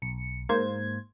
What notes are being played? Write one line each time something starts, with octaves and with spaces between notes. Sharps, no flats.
B1 C#7
G#2 A#3 C5 G#6